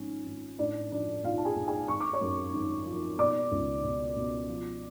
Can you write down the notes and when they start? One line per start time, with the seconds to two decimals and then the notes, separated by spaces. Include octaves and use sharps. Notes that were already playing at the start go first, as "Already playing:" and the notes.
Already playing: G#1 G#2 F3 C#4
0.26 G#1
0.59 A2 D4 D5
0.92 F3 D4 D5
1.24 B1 F4 F5
1.38 A5
1.45 G#4 G#5
1.56 B1
1.67 G#4 G#5
1.88 G#1 C#6
2.00 D6
2.13 C#5 C#6
2.21 F#2
2.54 G#1
2.86 F3
3.18 B2 D5 D6
3.52 C#2
3.84 B2
4.17 B2
4.49 F3